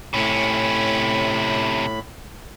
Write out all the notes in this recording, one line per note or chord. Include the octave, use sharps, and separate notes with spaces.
A2 C3 C#4 B5